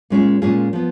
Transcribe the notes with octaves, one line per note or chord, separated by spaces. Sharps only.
A#2 G#3 C#4 F4 G#4
A#2 G#3 C#4 F4 G#4
F3 B3